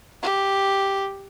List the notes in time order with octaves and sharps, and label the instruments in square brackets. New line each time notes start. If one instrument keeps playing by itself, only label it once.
[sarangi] G4